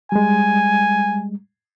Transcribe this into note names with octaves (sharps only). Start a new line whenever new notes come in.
G3 G#3 G#5